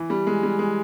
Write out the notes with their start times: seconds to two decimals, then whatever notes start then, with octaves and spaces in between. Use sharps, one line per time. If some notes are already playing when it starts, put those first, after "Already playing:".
Already playing: E3
0.10 G3
0.27 G#3
0.43 G3
0.59 G#3